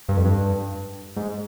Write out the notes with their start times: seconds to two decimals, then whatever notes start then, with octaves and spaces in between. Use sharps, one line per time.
0.09 G2
0.17 F2
0.25 G2
1.16 G#2